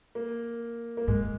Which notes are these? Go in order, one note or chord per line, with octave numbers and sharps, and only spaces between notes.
A#3
A#3
G#2 G#3